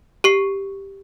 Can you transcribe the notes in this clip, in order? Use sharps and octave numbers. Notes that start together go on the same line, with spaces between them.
G4 C#6 C7